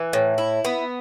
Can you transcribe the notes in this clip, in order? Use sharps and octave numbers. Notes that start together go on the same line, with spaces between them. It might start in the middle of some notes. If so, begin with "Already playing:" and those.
Already playing: E3
A2
E4
B3